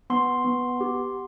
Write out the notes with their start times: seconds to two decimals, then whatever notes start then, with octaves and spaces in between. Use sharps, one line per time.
0.10 B3 C6
0.44 B3
0.81 G4